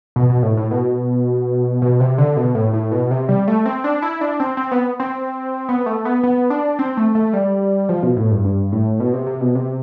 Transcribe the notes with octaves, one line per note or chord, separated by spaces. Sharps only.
B2
B2
A2
A2
B2
B2
C3
D3
B2
A2
A2
B2
C3
G3
A3
C4
D4
E4
D4
C4
C4
B3
C4
B3
A3
B3
B3
D4
C4
A3
A3
G3
F3
B2
A2
G2
G2
A2
B2
C3
C3
B2
C3